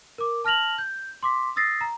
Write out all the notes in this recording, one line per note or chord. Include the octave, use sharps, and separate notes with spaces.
A#4 D6
A5 F6 A#6 F7 F#7
G6
C6 D6 B6
D#6 E6 A6 A#6 C7
A#5